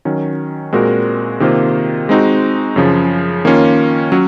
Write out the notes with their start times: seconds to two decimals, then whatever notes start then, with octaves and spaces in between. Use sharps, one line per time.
0.05 D#3 F#3 C#4
0.73 A#2 G#3 C4 F#4 A#4
1.40 C3 D#3 A#3 F4 C5
2.09 G#3 C4 D#4 F#4
2.76 F#2 C#3 F3
3.45 D#3 A#3 C#4 F4
4.12 F#3 C#4